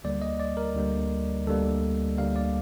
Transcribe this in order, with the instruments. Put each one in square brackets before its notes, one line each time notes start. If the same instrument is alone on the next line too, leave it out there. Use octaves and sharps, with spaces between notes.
[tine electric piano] D2 D3 G3 A#3 D5
D#5
D5
A#4
D2 D3 G3 A#3
D2 D3 G3 A#3 A4
D2 D3 G3 A#3 F5
D5